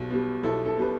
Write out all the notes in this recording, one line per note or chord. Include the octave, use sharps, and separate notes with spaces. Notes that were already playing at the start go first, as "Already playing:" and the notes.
Already playing: B1 B2 G3
B2 G3
B1 E4 A4
E4 A4
B2 G3 B4